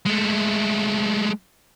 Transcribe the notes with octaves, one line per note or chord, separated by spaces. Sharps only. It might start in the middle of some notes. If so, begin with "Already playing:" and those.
G#3 A3